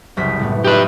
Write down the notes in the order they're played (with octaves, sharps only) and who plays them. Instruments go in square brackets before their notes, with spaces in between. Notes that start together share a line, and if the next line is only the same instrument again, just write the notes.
[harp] F#1 C2 B6
A2 A3 B3
[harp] D#4 F4 E5 [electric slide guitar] G4 B4